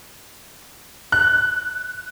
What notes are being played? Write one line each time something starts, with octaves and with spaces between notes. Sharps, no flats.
F#6